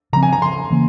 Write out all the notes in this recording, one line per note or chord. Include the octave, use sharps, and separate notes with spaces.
C#3 F3 C4 A#5
G#5
A#5
C6
C#3 E3 A#3 C#4